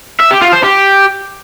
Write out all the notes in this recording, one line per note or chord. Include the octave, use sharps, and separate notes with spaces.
E5
G4
F4
C5
G4